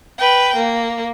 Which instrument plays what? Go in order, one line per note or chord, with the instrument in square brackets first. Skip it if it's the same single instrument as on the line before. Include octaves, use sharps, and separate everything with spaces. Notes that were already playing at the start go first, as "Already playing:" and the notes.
[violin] B4 G5
A#3